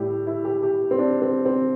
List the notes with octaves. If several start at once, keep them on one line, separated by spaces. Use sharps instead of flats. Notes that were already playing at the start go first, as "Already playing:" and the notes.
Already playing: A2 G3 E4 G4
E4
G4
G4
C4
D4
C4
C4